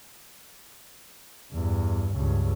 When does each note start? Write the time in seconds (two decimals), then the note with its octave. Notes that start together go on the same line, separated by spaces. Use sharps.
1.52 E2 G2
2.15 C#2 G2